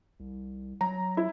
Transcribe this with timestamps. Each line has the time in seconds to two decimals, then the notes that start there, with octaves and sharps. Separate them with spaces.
0.20 C2
0.81 F#3 A#5
1.17 E4